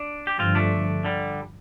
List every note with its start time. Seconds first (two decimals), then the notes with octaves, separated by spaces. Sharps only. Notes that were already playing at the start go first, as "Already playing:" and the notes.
Already playing: D4
0.27 G4
0.39 G2 D3 F3 C4 F4
0.55 A3 D4
1.05 D3 G3